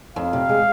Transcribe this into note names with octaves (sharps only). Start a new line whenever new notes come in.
F2 F5
C3
G#3